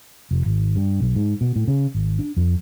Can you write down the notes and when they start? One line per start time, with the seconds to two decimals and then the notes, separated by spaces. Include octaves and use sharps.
0.31 F1
0.46 G#1
0.76 G2
1.00 B1
1.15 G#2
1.41 B2
1.56 A2
1.68 C#3
1.95 G#1
2.19 D4
2.37 F2